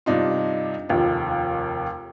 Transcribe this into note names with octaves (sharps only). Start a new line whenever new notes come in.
G2 C3 D4 D#4 F4
F1 D#2 F4